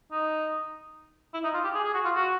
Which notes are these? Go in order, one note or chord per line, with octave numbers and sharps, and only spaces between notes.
D#4
E4
D#4
F4
G4
G#4
G#4
F#4
F4
F#4